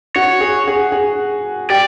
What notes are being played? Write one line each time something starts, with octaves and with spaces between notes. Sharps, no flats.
F#4 C#5
G#4
G#4
G#4
G4 D5